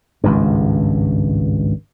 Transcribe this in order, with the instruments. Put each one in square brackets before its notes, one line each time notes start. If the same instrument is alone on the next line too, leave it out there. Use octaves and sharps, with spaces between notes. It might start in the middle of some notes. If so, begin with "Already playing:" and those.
[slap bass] G#1 C#2 G2